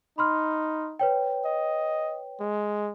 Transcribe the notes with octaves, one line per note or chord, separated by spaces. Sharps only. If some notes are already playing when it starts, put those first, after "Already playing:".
D#4 B5 C6 F6
B4 C#5 G5
D#5
G#3